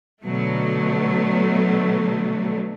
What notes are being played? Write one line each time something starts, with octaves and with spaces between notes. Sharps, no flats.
B2 D3 F#3 A3